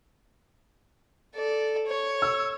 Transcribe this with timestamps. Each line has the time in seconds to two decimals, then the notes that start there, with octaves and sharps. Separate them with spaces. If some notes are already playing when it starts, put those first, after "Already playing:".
1.35 A4 D5
1.87 C#5
2.22 E6